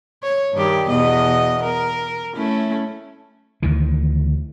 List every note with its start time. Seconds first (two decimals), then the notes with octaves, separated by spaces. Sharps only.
0.23 C#5
0.53 G2 D#3 G4
0.88 E2 B2 D#5
1.64 A#4
2.36 A3 C#4 E4
3.63 D2 D#3 E3